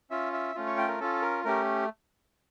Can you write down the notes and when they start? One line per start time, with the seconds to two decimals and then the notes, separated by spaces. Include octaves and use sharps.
0.10 C#4 F4 E5
0.33 E5
0.55 A3 C#4 F4
0.66 C#5
0.78 G5
0.88 A#4
1.00 C#4 F4 A4
1.22 A#4
1.44 A3 C#4 G4 A#4